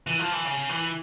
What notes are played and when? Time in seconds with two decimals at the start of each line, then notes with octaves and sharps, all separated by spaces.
0.07 E3
0.19 F3
0.32 E3
0.45 C#3
0.69 E3